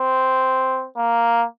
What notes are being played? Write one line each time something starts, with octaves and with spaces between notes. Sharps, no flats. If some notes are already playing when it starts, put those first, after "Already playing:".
Already playing: C4
A#3